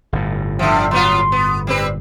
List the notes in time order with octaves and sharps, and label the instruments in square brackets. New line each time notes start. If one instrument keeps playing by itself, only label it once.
[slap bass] G1 A2
[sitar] D3 F3 [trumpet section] C4 E5
[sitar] F#3 B3 F4 [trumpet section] C6
[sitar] B3
G3 C4 B4